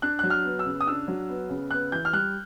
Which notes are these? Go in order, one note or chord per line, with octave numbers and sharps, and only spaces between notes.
D4 F#6
F#3 F#6
F6
B3
E6
C#3
D#6
D4 E6
F#3
B3
C#3
B3 F#6
E3 G6
F6
G3 F#6